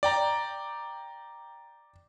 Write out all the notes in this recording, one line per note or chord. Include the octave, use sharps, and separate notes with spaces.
D5 G5 A#5